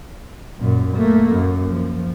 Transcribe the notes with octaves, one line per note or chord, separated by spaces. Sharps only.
F#2 A#2
A3 A#3
F#2
F3